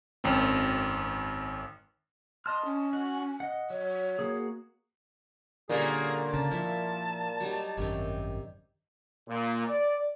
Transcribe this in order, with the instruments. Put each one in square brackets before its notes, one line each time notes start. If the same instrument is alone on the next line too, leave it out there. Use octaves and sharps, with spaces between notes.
[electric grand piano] G#1 F#2 C4
[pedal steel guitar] D#5 A5 F6 [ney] C6
[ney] C#4
[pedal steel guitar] F#4
D#5 F#5
[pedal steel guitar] F#3 [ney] C#5
[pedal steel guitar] A#3 F#4 G#4
[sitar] A#2 A#3 [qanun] D3 G3 C#4 [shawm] G#4
[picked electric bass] C#3 [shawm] A5
[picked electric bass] F3 [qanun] E4 E5
[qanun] F#3 G3 D#4
[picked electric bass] G#1 F#2 [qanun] C3 D#3
[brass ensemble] A#2
D5